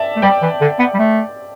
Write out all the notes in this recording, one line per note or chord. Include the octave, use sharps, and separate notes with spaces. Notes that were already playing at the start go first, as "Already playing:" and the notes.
Already playing: D5 E5 A5
A3
G3 D5 G5
E3
D3
B3
G3
A3